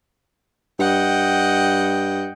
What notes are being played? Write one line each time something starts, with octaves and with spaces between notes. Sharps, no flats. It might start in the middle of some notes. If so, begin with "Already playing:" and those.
G2 D#5 F#5 G5